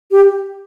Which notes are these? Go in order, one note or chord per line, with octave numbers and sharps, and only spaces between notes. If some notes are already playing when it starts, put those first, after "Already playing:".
G4